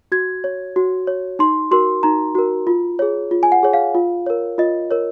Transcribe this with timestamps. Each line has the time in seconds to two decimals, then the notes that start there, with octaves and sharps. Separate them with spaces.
0.12 F#4 G#6
0.44 C#5
0.76 F#4
1.07 C#5
1.39 D#4 C6
1.71 F#4 A#4 C6
2.03 D#4 A#5
2.35 F#4 A#4
2.67 F4
2.99 G#4 C#5
3.31 F4
3.43 G#5
3.52 F#5
3.63 G#4 C#5
3.73 F5
3.95 F4
4.26 A#4 C#5
4.58 F4 D#5
4.91 A#4 C#5